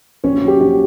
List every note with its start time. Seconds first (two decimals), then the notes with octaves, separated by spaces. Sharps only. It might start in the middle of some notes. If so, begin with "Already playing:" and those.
0.24 A#1 C#4 C#5
0.42 F#3
0.48 G4
0.60 A#1